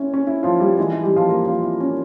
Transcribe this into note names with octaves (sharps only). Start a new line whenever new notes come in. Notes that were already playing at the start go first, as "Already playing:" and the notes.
Already playing: C4 C#4 E4
C#4
E4
F3 F4
G3 G4
E3 G#3
E4
G3 G4
F3 F4
A#3 A#4
F3 F4
E4
C#4